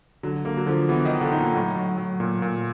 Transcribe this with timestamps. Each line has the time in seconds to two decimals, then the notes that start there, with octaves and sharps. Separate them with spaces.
0.23 D3 F#3
0.45 D3 A#3
0.57 F#3
0.66 D3 F3
0.89 E3 B3
1.05 D#3
1.11 D#4
1.21 D3
1.32 D#4
1.38 A#2
1.54 A2 F#3
1.76 F#3
1.98 F#3
2.20 A#2
2.42 A#2